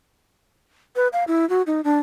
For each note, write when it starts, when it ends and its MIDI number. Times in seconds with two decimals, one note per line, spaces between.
0.96 1.08 71
1.13 1.24 77
1.28 1.48 64
1.50 1.62 66
1.67 1.81 63
1.84 2.00 62